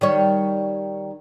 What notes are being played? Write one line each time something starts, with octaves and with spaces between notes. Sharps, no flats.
D#3 G3 C#5